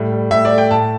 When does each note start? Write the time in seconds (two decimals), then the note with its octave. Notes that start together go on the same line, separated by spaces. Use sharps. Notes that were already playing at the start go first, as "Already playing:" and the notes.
Already playing: A2 G3
0.12 G3
0.31 A2 E5
0.45 D5
0.51 A3
0.58 G5
0.71 A2 A5